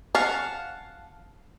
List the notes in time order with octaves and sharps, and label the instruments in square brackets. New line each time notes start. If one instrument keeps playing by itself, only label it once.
[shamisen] C#4 [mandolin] F5 F#5 A5